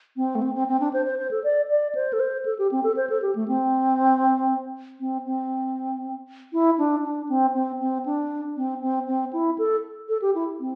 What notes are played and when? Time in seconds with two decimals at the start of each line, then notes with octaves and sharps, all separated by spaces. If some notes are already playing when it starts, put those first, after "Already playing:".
0.16 C4
0.35 A3
0.42 C4
0.55 C4
0.68 C4
0.80 D4
0.93 C5
1.06 C5
1.18 C5
1.31 A4
1.44 D5
1.70 D5
1.95 C5
2.13 A4
2.20 C5
2.45 A4
2.58 G4
2.71 C4
2.83 A4
2.97 C5
3.09 A4
3.22 G4
3.35 A3
3.48 C4
5.00 C4
5.26 C4
6.53 E4
6.78 D4
7.04 D4
7.29 C4
7.54 C4
7.80 C4
8.05 D4
8.57 C4
8.82 C4
9.07 C4
9.33 E4
9.58 A4
10.09 A4
10.22 G4
10.35 E4
10.60 C4